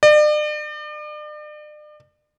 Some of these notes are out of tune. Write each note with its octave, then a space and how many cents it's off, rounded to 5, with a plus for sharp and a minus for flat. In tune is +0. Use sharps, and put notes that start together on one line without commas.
D5 +40